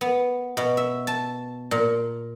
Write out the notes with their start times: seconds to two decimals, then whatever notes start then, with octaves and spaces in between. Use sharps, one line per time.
0.01 B3
0.57 B2
0.77 E5
1.07 A5
1.71 A#2